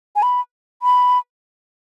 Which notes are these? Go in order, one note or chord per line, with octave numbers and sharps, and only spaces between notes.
G#5
B5
B5